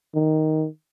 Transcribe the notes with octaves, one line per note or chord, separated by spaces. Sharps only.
D#3